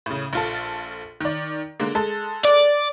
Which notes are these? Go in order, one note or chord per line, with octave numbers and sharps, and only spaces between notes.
A2 C#3
A#1 F4 A4
D#3 D5
D3 G#3 A#3
G#3 A4
D5